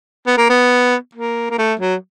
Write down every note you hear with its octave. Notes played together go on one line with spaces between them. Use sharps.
B3
A#3
B3
A#3
A#3
A3
F#3